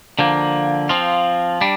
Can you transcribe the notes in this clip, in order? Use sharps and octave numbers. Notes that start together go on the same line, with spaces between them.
D3 F3 A#3
F3 C4 F4
G3 D4